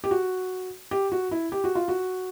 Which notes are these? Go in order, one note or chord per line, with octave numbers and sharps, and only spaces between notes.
G4
F#4
G4
F#4
E4
G4
F#4
F4
F#4